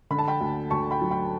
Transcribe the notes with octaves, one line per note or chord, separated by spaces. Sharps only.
D3 B5
A5
G5 B5
D2
D2 A5 C#6
G5 B5
F#3
G5 B5